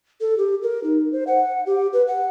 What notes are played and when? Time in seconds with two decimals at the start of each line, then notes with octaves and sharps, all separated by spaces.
0.21 A4
0.38 G4
0.63 A#4
0.84 D#4
1.13 C5
1.27 F#5
1.66 G4
1.93 B4
2.08 F#5